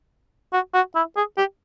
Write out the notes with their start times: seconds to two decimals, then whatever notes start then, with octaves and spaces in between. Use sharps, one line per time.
0.53 F#4
0.74 F#4
0.96 E4
1.16 G#4
1.37 G4